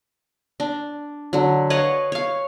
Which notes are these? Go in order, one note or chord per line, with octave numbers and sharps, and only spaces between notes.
D4
D3 F#3
B4 C#5 D#5 F5
C#5 F5